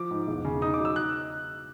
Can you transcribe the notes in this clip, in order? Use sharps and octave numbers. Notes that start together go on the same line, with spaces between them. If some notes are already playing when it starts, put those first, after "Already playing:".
Already playing: F3 D6
G#2
E1
C#3
D#4 D#6
D6
F#3
E6
F#6